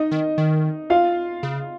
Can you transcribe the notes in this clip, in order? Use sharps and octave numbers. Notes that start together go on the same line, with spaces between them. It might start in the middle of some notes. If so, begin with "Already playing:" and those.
Already playing: D#4 D#5
D#3
D#3
F4 F5
C#3